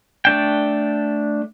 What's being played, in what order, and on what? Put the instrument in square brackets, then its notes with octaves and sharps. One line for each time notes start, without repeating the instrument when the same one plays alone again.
[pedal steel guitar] A3 D4 G5